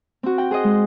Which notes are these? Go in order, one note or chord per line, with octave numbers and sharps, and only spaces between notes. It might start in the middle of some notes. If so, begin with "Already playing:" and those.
C4 F#4
F#5 G5
G#4 C5 D#5
G#3